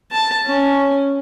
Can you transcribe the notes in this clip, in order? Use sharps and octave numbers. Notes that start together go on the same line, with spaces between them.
A5
C#4